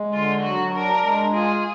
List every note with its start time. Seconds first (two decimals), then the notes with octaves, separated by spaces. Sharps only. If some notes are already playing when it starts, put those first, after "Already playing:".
Already playing: G#3
0.13 D3 F4
0.42 F#3 F#4
0.72 D4 A#4
1.02 G#3
1.32 F4 G#4